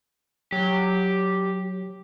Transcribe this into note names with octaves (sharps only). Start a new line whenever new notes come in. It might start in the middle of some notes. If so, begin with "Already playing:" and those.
F#3 G4